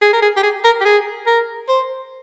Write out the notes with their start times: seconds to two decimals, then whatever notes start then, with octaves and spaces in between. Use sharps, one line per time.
0.02 G#4
0.13 A#4
0.22 G#4
0.37 G4
0.43 G#4
0.64 A#4
0.81 G4
0.85 G#4
1.26 A#4
1.69 C5